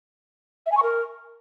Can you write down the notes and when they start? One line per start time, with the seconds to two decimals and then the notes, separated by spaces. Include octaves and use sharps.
0.66 E5
0.72 G#5
0.77 C#6
0.83 A#4